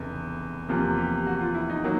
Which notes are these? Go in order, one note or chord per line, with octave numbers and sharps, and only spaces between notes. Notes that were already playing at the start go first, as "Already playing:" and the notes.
Already playing: F1 E2 C#3
E2 C3 F3 A#3
G4
F#4
F4
E4
D#4
D#3 F#3 A#3